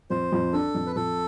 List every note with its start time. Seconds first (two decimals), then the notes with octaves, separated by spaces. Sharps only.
0.10 F2 C5
0.32 F2
0.53 D4 A4
0.75 F2
0.86 B4
0.96 F2 A4